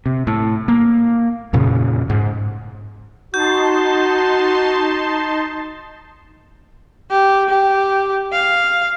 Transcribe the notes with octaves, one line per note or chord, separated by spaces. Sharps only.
C3
A2
A#3
F2 A#2 C#3
G#2
D#4 F#4 A5 C6 G6
G4
G4
F5